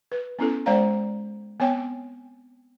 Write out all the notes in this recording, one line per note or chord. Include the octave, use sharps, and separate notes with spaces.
B4
B3 C#4 E4 A4
G#3 C5 D5 F5 A#5
B3 C4 C#5 G5